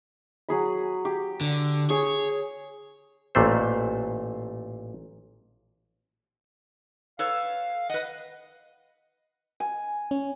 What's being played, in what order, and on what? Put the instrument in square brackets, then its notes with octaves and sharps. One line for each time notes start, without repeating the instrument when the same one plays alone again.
[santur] F#3 G#4 B5
G4
[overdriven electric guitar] D3
[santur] G#4 [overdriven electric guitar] C#5
[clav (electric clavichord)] A1 A#2 A3 C5
[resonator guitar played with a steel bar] A4 B4 C#5 [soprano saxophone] F5
[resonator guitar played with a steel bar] B4 F#5 [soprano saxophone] D#5
[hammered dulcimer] G#5
[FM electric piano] C#4